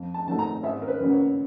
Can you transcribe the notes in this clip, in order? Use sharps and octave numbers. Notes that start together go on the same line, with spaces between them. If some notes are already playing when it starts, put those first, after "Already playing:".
Already playing: F2
A5
C3 D#3 F#3 A3 A5
A#5
G#1 E5
A#4
B4
F#2 C#3 F#3 A#3
C#5